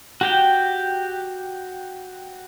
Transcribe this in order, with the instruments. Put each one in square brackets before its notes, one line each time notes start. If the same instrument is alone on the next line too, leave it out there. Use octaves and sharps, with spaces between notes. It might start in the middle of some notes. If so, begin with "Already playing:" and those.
[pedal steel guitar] F#4 G4 G5